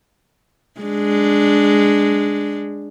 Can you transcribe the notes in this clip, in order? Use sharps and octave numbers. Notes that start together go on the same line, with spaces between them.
G#3 D4